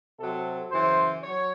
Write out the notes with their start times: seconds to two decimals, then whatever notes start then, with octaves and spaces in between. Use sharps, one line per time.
0.20 C3 F#3 A4
0.72 F#2 C#3 E3 C5
1.23 F#3 C#5